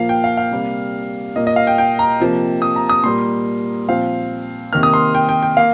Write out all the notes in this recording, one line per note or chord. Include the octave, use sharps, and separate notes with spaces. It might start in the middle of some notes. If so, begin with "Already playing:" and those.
Already playing: A#2 F3 A#3 F5
G5
F5
F5
C3 G3 A#3
A#2 A#3 D#5
D#5
F5
G5
G5
A#5
C3 F3 A#3
D#6
A#5
D#6
A#2 G3 A#3 C6
A#2 F3 C4 F5
C3 D#3 A#3 F6
D#6
C6
G5
G5
G5
A#3 F5